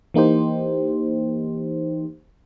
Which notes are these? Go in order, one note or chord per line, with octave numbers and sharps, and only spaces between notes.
E3 A#3 D#4 G4 C5